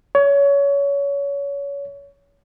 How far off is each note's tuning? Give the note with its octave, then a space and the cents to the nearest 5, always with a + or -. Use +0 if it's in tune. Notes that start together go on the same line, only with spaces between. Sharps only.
C#5 +25